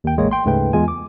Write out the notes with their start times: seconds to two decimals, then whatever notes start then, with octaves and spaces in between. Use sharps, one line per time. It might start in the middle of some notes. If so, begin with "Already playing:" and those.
0.04 D#2 G5
0.17 A1 G#3 A#3 C#5
0.31 G5 C6
0.45 D2 G#2 C#3 A3 B4 G5
0.73 E2 G#3 F4 G#5
0.88 D6